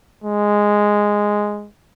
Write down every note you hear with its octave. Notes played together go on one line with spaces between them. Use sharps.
G#3